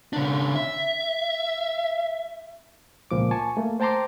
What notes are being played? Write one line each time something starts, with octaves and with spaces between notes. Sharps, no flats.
C#3 D4
E5
C#2 A#2 F3 D6
G#5 A5 C#6
A3 A#3
C5 G5 A5 A#5 C6 D6